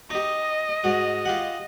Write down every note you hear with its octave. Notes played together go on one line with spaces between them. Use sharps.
D#4 G4 D#5
G#2 F#4
F4 G4 F#5